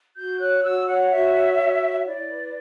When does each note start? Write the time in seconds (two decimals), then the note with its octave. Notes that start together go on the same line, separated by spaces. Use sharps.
0.15 F#4 G6
0.39 C#5 F#6
0.62 F#4 E6
0.87 C#5 F#5
1.10 F#4 E5
1.34 C#5
1.58 F#4
1.82 C#5
2.05 E4 D5
2.28 B4